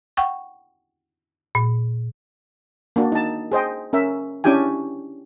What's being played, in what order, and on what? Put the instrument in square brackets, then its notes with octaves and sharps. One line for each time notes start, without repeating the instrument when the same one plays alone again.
[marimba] F#5 G5 C#6
A#2
[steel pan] A#3 D4 F#4
D#4 A5
G#4 C5 D#5 G5
C#4 A#4 E5
C#4 D4 E4 G4 G5 G#5